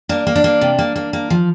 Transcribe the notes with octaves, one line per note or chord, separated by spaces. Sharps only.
A#3 D4
A#3
D4
A#3
C3
A#3
A#3
A#3
F3